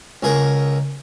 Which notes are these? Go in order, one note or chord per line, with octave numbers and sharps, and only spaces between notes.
C#2 G#4 A#4